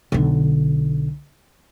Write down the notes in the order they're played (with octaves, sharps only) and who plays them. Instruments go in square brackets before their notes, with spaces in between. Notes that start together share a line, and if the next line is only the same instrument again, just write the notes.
[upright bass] B1 D3